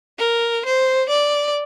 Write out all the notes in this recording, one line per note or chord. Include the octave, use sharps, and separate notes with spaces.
A#4
C5
D5